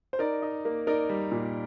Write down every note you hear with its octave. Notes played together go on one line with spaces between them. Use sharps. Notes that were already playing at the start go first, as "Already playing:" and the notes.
C5
D#4 A#4 D5
D#4
A#3
D#4 A#4 D5
G3
A#2